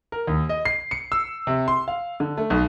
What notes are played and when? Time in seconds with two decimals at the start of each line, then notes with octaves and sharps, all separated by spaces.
0.12 A#4
0.27 D#2
0.49 D#5
0.65 C7
0.91 C#7
1.12 E6
1.47 C3
1.68 C6
1.88 F5
2.20 D3
2.38 A3
2.50 B1